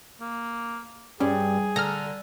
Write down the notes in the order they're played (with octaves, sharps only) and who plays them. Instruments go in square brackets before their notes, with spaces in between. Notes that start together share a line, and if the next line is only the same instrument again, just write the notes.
[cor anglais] A#3
[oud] G2 [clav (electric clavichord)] G3 [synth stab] C#4 [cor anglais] G#4
[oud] D3 [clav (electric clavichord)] A4 [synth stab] A#5 F6